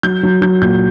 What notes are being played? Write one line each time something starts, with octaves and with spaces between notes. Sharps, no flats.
F#3 G6
F#3
F#3 G6
A#2 G6